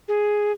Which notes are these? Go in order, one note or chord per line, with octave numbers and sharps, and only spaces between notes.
G#4